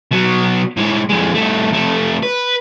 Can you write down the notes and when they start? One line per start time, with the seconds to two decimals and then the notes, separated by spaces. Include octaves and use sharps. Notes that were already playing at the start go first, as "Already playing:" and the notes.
0.12 B2 F#3
0.77 A2 G#3
1.09 F2 G#3
1.35 C2 A3
1.73 F2 A3
2.23 B4